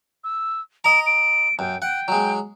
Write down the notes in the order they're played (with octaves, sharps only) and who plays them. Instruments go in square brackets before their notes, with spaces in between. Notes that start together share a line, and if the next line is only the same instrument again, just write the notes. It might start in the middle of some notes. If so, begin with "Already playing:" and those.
[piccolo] E6
[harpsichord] D#5 A#5 [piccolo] D7
[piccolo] D7
[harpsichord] F#2 [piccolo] G5
[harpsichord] F#5 [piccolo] G5
[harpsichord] F#3 G#3